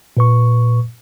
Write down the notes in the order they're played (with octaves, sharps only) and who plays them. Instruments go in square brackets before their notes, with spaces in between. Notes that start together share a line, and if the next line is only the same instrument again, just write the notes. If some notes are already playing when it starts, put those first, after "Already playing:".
[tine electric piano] A#2 B4 C#6